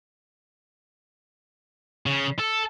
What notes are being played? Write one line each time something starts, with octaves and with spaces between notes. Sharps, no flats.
C#3
A4